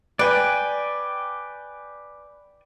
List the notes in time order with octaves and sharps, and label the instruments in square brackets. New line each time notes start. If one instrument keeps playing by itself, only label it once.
[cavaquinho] B4 [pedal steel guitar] D5 G5 G#5